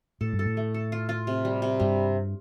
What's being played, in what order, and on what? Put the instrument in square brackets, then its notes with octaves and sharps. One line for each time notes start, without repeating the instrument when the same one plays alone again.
[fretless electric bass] A2 [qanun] A4
[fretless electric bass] G2
[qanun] A4
[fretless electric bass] A2
[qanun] A3
A4
F4
F4
C3
G3
C3
[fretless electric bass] G2 [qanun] G3